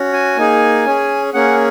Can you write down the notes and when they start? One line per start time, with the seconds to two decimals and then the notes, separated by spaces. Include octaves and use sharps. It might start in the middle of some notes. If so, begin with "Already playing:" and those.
Already playing: C#4 F#4
0.13 G#5
0.37 A#3 D#4 G#4
0.86 C#4 G#4
1.34 A#3 C#4 G#4 F#5